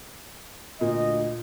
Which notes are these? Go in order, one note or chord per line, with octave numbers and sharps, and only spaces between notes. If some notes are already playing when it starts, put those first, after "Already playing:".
D2 A#2 D#5